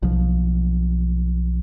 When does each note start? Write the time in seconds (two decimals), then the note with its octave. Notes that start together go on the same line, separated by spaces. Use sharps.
0.03 B1 F3